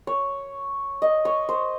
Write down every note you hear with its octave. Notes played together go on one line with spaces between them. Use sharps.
C#5
D#5
C#5
C5